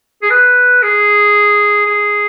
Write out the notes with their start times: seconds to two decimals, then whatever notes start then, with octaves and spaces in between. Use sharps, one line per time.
0.22 G#4
0.30 B4
0.83 G#4
1.86 G#4